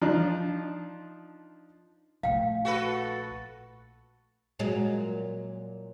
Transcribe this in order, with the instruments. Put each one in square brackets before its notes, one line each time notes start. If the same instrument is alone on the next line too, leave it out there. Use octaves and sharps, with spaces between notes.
[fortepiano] F3 D4 D#4 F4
[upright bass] A#1 A3 [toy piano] F5 G5
[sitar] F#4 A4 B4
[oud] A#2 F#3 G#3